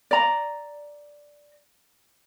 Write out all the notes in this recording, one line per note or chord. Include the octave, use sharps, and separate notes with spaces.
D5 A#5